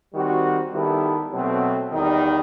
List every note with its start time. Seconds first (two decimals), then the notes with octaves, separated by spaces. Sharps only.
0.13 D#3 G3 C4 F#4
0.72 D#3 G3 B3 E4 A4
1.33 B2 F#3 A3 C4
1.91 E2 D#3 G3 D#4